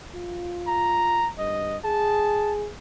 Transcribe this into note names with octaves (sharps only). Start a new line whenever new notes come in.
F4
A#5
G2 D#5
G#4 A5